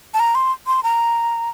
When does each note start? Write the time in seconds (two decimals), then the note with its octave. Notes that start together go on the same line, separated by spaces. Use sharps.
0.14 A5
0.20 A#5
0.35 C6
0.67 C6
0.83 A#5